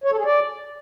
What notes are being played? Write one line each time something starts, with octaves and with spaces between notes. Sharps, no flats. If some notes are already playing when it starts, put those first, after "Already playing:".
C#5
A4
G#4
D5